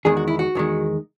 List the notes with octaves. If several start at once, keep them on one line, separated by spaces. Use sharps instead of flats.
E2 D#3 G#3 G#4
F#4
E4
F#4
E2 D#3 G#3